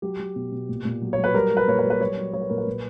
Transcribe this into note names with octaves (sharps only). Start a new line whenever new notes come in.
F#3 G4
F#3
B2
B2
A#2
A#2
F#3
C#5
F#3
B4
G3 A#4
G3
B4
A#2 C#5
B4
G3
B4
F#3 C#5
F#3
F#3 C#5
B4
A#2 A#4
B4
A#2